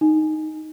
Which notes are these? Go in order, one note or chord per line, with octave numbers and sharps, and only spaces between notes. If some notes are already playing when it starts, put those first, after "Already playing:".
D#4